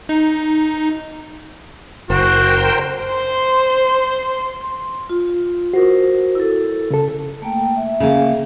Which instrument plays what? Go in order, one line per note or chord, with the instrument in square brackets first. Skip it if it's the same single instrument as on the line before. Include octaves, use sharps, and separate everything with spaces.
[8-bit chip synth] D#4
[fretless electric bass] F#1 [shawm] F#4 [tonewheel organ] A#4 C5 G5
[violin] C5 C6
[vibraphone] C6
F4
[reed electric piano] F#4 [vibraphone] A#4 C5
[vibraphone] E4 A4
[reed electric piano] C#3 A4
[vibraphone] A3 A#3 G5
E5
[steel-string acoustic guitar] C#3 A#3